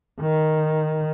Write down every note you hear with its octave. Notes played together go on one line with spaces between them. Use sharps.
D#3